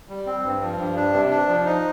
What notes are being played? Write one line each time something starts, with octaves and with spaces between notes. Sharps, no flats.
G3
C4
G2
F3
G2
D4
C3
D4
F3
D#4